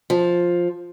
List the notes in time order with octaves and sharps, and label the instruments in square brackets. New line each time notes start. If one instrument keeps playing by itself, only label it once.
[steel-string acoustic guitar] F3